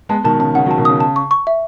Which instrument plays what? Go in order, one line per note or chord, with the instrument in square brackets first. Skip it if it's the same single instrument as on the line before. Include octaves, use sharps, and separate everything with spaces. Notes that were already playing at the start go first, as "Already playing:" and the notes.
[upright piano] G#3 B3 [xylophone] A5
[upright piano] B2 D#3 [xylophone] A5
[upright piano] C#3 [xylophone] A5
[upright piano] C#3 [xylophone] F#5
[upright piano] D#3 F#3
[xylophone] A5
[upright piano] B2 D#3
[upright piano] C#3 [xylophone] D#6
[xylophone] A5
C#6
C#6
E5